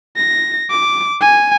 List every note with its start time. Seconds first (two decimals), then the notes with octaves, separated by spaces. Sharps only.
0.17 A#6
0.70 D6
1.21 G#5